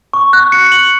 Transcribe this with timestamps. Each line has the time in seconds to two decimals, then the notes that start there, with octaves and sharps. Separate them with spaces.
0.14 C#6
0.33 F#6
0.52 C#7
0.72 F#7